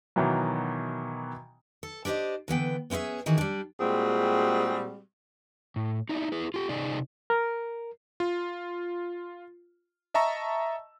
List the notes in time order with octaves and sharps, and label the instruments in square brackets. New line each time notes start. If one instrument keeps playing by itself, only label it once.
[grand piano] B2 D#3 E3 F#3
[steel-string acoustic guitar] A4
D4 G4 G#4 C5 D#5
D3 E3 B3 G5
B3 C#4 E4 G#4 E5
D#3 E3 F#4 G#4
G3 D4
[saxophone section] A#2 G3 G#3 C4 F#4 G#4
[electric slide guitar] A2
D#4 E4 D5
E4 G#4 B4
F4 G4
C3 D#4 G#4 D5
[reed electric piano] A#4
[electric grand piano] F4
D#5 E5 A5 A#5 C#6 E6